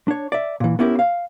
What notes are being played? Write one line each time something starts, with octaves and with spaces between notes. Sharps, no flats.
D4 C#5
D5 E5
A#2 E3
B3 C#4 E4 G4 A#4
F5